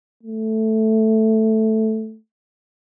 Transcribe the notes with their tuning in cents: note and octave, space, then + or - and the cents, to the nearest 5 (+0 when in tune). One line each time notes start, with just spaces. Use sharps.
A3 +0